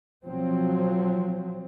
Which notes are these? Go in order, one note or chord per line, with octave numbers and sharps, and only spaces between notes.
B1 F3 F#3 C4